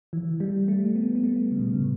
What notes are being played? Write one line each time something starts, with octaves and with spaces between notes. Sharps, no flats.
E3
G3
A3
B3
B3
A3
C#3
B2
C#3
A2